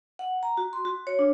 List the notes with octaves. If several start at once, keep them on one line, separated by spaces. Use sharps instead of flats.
F#5
A#5
F#4
C6
F#4
C#5
D4